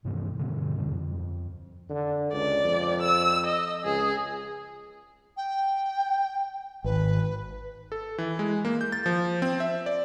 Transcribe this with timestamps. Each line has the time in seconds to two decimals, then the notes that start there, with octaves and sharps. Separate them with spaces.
0.05 G2 C3 E3 A3
0.39 G2 B2 D3
0.77 D1 F#2 D3 G3
0.91 F2
1.90 D3
2.33 C#2 D5
2.64 F2
3.02 E6
3.46 D#5
3.85 C#2 G#4
5.37 G5
6.84 G#1 B4
7.92 A4
8.18 E3
8.39 G#3
8.65 A#3
8.81 G6
8.92 A6
9.06 F3
9.42 C4
9.60 E5
9.86 D5